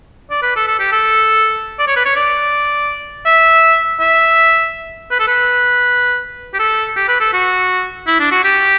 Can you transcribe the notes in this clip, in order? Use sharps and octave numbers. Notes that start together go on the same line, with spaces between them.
D5
B4
A4
A4
G4
A4
D5
C#5
B4
C#5
D5
E5
E5
B4
A4
B4
G4
A4
G4
B4
A4
F#4
E4
D4
F#4
G4